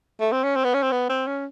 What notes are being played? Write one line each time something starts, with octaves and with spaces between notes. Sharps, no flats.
A3
C4
C#4
C4
B3
C#4
C4
B3
C4
C#4